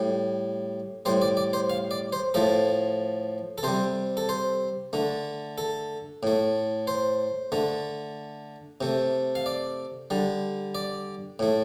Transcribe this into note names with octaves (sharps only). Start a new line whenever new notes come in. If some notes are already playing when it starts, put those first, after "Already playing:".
Already playing: A2 G3
A2 G3 C5
D5
D5
C5
F5
D5
C5
A2 F3 A3 A4
A4
C3 G3 C5
A4
C5
D3 A3
A4
A2 A3
C5
D3 A3
C3 A3
F5
D5
D3 G3
D5
A2 A3